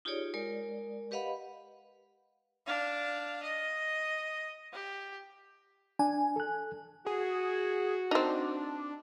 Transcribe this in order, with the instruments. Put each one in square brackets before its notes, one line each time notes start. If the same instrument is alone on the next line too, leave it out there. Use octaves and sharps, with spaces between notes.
[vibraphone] D#4 F4 G4 G#4 C#5 D5
G#3 A#4 D5
G4 B4 D#5 F5 F#5 B5
[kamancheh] D4 F5
D#5
G4
[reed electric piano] D4 [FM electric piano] G#5
[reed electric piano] A4 F#6
[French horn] F#4 [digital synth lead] G#4
[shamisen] C4 D#4 [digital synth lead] D4